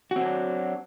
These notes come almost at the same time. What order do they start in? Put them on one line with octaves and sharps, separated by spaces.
F#4 C4 F#3 D4